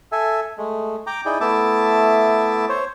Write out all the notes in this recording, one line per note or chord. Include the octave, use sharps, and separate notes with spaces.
A4 E5 G#5
G#3 A3
G5 A#5 D6
D#4 E4 G#4 D5 G5
A3 B3 E4 E5 A5 D6
C5 C#5